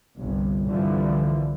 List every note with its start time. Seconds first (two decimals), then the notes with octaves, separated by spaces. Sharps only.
0.19 G1 C2 G2
0.69 C2 G2 D3 E3 F3 G3